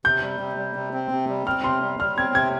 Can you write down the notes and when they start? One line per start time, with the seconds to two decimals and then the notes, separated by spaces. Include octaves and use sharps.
0.05 C3 G6
0.23 G3
0.40 C3
0.58 G3
0.76 C3
0.94 C4
1.11 C3
1.29 G3
1.47 C4 F6
1.64 C3 C6
1.82 G3
1.99 G3 F6
2.17 C4 G#6
2.35 C3 G#6